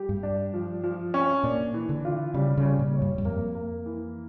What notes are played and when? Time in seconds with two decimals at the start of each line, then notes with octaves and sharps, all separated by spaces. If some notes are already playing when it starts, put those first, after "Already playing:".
Already playing: G3 G4
0.09 G2
0.23 D4
0.54 F3
0.84 F3
1.14 C#4
1.44 A#2 D4
1.74 E3
1.89 D3
2.05 F4
2.34 C#3 G3
2.57 C#3
2.65 G3
2.79 A#2
2.94 C#5
3.02 G2
3.18 G2
3.24 F2 A#3
3.55 A#3
3.86 E3